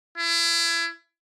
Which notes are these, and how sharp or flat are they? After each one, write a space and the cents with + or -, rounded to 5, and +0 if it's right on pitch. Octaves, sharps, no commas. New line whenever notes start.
E4 +30